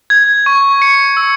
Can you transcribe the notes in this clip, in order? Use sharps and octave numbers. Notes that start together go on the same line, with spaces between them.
G#6
C#6
C#7
E6